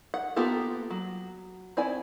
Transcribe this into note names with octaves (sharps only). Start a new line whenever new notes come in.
F#5
A#3 B3 F4 G4 A4
F#3
C4 E4 D5 G#5